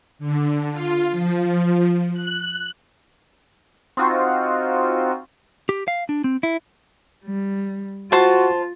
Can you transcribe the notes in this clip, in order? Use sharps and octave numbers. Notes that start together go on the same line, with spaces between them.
D3
F4
F3
F#6
C4 D#4 F4 F#4
G4
F5
D4
C4
E4
G3
F4 F#4 C5 A5